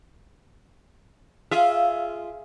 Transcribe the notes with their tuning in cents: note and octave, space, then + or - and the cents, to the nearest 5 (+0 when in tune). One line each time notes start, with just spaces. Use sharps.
F4 -10 G#4 +10 E5 +0